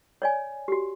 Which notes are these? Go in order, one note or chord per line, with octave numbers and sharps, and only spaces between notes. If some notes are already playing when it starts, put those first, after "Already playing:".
C#5 D5 G#5
F#4 G4